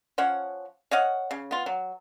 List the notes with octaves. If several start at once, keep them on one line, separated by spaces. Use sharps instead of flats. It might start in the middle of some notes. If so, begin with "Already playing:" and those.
F3 C#4 C#5 F#5
C#5 D#5 F5 F#5
C#3
B3 F4
F#3